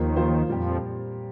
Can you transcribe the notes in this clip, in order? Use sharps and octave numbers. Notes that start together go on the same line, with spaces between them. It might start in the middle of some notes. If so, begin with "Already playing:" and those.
Already playing: D#2 D#3 F3 A#3 F4 C5
F3 A#3 F4 C5
F2 A#2 F3 G3 C4 G4